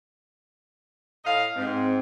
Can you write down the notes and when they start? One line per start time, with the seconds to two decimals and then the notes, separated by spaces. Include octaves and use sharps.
1.24 A2 D#5 F5
1.55 G#2 C4